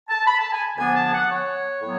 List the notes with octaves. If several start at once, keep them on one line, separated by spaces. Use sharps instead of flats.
A5
B5
A5
G#5
D2 D3 F3 B3 D4 G#5
A5
F#5
C#5
A2 F#3 B3